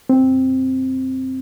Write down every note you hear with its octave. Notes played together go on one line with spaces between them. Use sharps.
C4